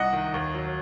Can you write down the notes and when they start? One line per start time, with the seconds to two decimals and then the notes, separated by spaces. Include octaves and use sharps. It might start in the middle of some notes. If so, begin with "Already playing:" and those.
Already playing: C2 D#5 F#5
0.13 D#3
0.34 D#2
0.55 F#3